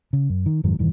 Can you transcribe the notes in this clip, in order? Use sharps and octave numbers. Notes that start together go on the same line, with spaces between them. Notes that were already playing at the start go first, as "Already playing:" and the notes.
C#3
F#2
D#3
F2 G#2 D#3 F#3
E1 G2 D#3 E3